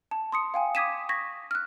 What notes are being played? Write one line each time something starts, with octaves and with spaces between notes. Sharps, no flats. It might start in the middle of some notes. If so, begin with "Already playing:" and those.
A5
C6 D#6 C#7
F5 G5 G#5
D6 D#6 G#6 B6 D#7 E7
C#6 G#6 A#6 B6
F6 F#6